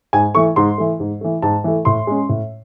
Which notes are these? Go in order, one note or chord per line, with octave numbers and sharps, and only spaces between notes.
G#2 G#5
E3 A3 C#6
G#2 C6
E3 A3
G#2
E3 A3
G#2 A5
E3 A3
A2 C6
G#3 C#4
A2